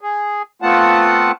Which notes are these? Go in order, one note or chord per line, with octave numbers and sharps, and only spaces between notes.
G#4
A3 B3 C4 F4 F#5 A5